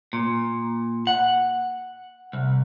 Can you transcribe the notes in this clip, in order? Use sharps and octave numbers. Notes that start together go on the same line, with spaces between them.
A#2
F#5
C2